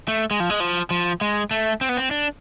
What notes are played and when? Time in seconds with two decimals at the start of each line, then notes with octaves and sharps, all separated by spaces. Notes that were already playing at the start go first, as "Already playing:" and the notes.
0.08 A3
0.31 G#3
0.40 F3
0.50 G#3
0.60 F3
0.91 F3
1.21 G#3
1.51 A3
1.81 C4
1.89 B3
1.97 C4
2.11 D4